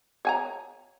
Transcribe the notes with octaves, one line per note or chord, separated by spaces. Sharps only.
C#5 G#5 A#5